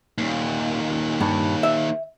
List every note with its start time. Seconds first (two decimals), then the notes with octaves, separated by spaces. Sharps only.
0.18 D#2 A#2
1.21 G2
1.63 E5